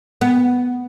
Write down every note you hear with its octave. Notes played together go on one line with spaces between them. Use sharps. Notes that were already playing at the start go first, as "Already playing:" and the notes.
B3